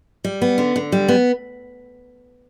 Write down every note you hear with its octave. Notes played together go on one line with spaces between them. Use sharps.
G3
B3
D3
D3
G3
B3